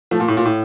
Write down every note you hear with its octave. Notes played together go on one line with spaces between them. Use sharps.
F3 A3
A#2
A2
A#2
A2